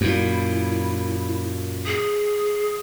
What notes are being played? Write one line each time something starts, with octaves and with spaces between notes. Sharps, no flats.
F#2 A#2 E4
G#4